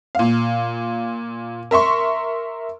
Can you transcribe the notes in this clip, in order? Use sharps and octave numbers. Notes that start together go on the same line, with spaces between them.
A#2 F5
A#4 E5 C6 C#6